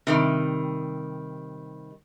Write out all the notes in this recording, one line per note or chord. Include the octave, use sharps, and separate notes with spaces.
C3 D#3 G3